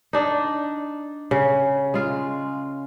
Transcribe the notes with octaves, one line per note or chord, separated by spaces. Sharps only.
D4 D#4
C#3
G#3 F4